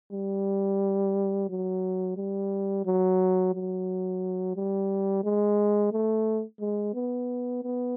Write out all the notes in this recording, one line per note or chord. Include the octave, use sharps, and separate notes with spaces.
G3
F#3
G3
F#3
F#3
G3
G#3
A3
G#3
B3
B3